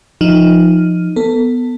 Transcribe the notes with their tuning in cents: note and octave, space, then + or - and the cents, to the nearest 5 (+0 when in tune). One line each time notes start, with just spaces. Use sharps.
F3 +0 D#4 +0
B3 +0 A4 +25